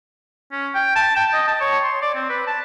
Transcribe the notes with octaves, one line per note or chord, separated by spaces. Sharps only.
C#4
G5
A5
G5
D#5
A5
C#5
C6
D5
C4
B4
A5